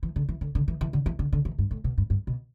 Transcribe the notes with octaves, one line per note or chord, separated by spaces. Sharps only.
E3
D3
E3
D3
D3
E3
E3
D3
E3
D3
D3
E3
G2
A2
B2
G2
G2
B2